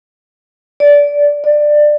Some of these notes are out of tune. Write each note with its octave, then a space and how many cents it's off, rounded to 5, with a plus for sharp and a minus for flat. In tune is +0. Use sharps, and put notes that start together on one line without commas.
D5 -20
D5 +15